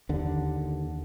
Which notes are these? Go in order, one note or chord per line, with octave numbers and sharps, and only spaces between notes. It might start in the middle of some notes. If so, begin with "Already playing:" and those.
D#2 D3